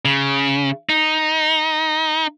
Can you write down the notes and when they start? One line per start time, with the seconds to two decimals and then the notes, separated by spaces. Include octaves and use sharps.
0.05 C#3
0.89 D#4